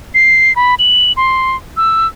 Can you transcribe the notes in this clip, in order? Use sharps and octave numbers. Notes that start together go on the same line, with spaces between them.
C7
B5
F#7
C6
E6